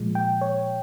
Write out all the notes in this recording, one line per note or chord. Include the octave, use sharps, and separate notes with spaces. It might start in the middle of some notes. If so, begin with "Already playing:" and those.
Already playing: A#2 F3 G#3
G5
C#5